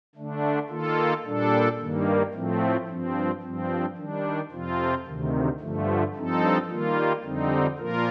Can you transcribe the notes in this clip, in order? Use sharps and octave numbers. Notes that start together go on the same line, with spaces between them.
D3 A3 D4
D#3 A#3 F4 A4
A#2 G3 D4 A4
G2 D#3 G3 A#3
A2 F3 A3 C4
G2 F3 C4
G2 F3 C4
D#3 G3 D4
F2 C3 F3 C4 F4
D2 C3 D#3
G2 D3 F3 A3
G2 F3 C4 D#4 A4
D#3 G3 A#3 F4
F2 D3 G3 C4 D#4
A#2 F3 A#3 F4 A#4